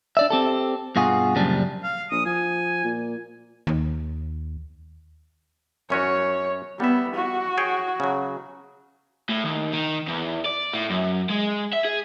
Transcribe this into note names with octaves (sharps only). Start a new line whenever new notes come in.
D4 D5 E5
C4 G4 A4
G2 B2 F4 F#4 G#4
F#2 A#2 C#3 F3 G3 D4
F5
A#1 D#6
F3 G#5
A#2
D#2
F#2 C#4 F#4 C#5
G3 B3 E5
F#4
G#4 C#5 G5
C#3 F#3
A2
D#2
D#3
E2
D5
A2
F#2
G#3
E5
G#4